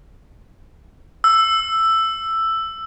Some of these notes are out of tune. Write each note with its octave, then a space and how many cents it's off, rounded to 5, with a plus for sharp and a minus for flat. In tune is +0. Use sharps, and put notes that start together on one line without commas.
E6 +5